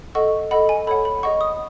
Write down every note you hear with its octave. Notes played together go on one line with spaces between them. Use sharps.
A4 D#5 F#5 C#6
A4 D#5 F#5 B5
G#5
A4 C#5 F#5 B5
B5
G#4 D#5 F#5 C#6
D#6